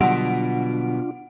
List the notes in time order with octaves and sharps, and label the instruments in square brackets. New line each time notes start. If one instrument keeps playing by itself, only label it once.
[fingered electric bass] B2 [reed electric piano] D3 F#3 G3 [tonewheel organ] D4 F4 [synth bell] F#5 D7